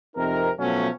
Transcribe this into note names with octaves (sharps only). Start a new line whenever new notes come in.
F2 C3 D#4 A#4
B2 F3 F#3 A3 C#4